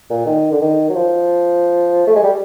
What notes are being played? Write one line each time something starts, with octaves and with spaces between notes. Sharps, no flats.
A#2
D#3
D3
D#3
F#3
F3
A3
G#3
G3